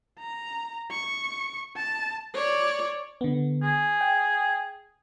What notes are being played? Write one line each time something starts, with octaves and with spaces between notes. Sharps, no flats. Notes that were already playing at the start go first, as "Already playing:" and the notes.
A#5
C#6
A5
C#5 D5
D3 B3
G#4
G5